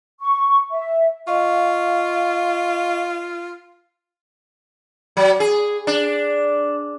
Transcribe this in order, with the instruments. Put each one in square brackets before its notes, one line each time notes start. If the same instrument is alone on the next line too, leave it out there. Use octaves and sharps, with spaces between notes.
[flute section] C#6
E5
[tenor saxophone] F4 [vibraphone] D#5 F5 C#6
[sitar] F#3
G#4
D4